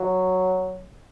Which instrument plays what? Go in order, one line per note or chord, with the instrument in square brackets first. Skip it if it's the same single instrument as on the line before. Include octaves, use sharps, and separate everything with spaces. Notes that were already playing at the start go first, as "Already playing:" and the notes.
Already playing: [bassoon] F#3